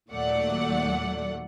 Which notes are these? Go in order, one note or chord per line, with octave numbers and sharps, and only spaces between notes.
D#2 A#2 F#3 A3 D5 F#5